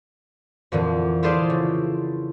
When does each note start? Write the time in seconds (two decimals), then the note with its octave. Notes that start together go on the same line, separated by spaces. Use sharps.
0.72 F2 A#2 D3 E3
1.23 E4 F4 G#4 A4 C5 D5
1.50 C#3